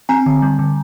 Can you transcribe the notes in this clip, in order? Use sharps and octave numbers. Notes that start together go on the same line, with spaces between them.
C4 G#5 A#5
D3
G3
D3